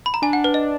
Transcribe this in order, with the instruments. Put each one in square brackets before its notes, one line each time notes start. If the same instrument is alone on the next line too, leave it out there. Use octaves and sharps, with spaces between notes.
[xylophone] B5
A#5
[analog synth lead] D4 [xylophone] G#5
[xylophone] F#5
B4
D#5